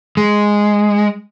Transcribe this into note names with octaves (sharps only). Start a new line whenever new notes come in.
G#3